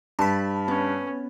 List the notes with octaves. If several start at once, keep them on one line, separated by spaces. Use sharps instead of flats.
G2 A5 B5
B3 C#4